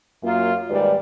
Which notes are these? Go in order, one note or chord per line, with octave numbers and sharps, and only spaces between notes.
F#2 A#3 F4
D#2 G#2 G3 G#3 B4 D5